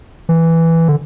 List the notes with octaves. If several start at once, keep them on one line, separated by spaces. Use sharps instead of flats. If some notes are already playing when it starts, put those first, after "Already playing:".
E3
D3